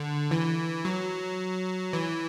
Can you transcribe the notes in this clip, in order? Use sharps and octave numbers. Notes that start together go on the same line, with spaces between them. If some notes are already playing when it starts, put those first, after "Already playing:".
Already playing: D3
E3
F#3
E3